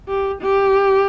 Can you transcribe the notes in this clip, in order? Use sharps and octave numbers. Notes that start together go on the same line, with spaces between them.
G4
G4